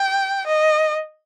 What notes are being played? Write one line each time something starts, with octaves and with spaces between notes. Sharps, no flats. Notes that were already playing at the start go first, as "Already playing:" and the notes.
Already playing: G5
D#5